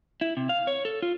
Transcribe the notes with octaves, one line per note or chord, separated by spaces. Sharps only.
E4
C3
F5
C#5
A4
F4